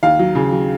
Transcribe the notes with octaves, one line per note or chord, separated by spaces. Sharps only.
D#2 F5
F#3
C#3
F#3